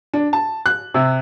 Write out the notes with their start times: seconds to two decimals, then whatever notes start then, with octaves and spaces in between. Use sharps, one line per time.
0.14 D4
0.33 A5
0.66 F#6
0.94 C3